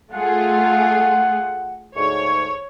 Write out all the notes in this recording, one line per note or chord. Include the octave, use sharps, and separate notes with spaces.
A3 F4 G#4 F#5
D2 G#2 C#5 C#6